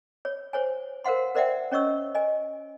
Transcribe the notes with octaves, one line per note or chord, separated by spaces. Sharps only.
C#5
C5 C#5 G#5
A#4 C5 F5 F#5 C6
A#4 C5 D5 E5 F#5 G5
C#4 C#5 D#5 C#6 E6
D#5 G#5